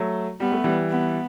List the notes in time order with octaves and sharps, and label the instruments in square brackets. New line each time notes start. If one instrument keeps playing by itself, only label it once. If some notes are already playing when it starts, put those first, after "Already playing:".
Already playing: [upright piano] F#3 A3
[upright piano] G3 [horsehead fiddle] B3
[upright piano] A3
E3 G3
[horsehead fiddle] B3